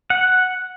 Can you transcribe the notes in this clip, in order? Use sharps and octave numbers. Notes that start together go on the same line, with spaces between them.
F#5